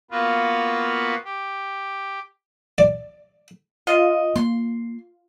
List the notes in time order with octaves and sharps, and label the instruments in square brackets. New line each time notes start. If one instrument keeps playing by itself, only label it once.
[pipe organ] A#3 B3 F4 F#4 B4
G4
[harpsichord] D5
[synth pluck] F4 [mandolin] D#5
[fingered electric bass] A#3 [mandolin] C6